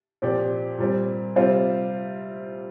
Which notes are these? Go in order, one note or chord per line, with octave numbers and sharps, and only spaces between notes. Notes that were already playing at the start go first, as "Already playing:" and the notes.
A#2 F3 C4 G4 D5
A#2 G3 C4
C3 G3 C4 F4 C5